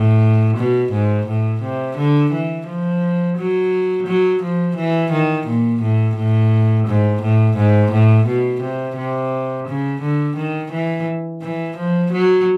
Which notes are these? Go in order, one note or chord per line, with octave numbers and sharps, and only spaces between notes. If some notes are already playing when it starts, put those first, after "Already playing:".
Already playing: A2
B2
G#2
A2
C3
D3
E3
F3
F#3
F#3
F3
E3
D#3
A#2
A2
A2
G#2
A2
G#2
A2
B2
C3
C3
C#3
D3
D#3
E3
E3
F3
F#3